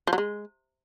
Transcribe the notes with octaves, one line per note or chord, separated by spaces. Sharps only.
F3
F#3
G#3